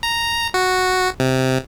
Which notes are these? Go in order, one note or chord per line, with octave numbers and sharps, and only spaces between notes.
A#5
F#4
C3